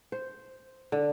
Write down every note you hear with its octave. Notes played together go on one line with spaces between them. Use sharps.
C5
D3